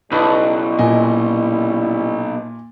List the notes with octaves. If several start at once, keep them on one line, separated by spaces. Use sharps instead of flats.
B1 C#3 G3 E4 B4 D#5
A#2 D#5 G#5